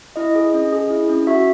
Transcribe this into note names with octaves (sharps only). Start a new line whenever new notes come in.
E4 D#5
G#4
C#4
G#4
E4
C#4
F#4 E5